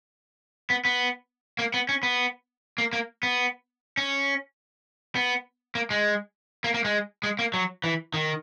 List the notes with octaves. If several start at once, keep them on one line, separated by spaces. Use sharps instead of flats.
B3
B3
A#3
B3
C#4
B3
A#3
A#3
B3
C#4
B3
A#3
G#3
A#3
A#3
G#3
G#3
A#3
F#3
E3
D#3